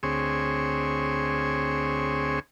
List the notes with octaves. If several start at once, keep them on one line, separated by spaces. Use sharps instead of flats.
D2 C4 G#4 C#5